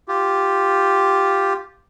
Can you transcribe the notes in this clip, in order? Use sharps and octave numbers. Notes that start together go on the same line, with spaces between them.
F4 G4